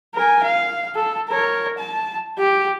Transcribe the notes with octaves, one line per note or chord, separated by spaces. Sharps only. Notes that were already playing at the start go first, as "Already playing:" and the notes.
A#4 G#5
F5
A4
A#4 C#5
A5
G4